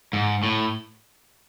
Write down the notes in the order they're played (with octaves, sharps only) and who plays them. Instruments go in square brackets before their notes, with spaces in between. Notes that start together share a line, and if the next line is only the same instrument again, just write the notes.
[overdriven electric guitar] G#2
A2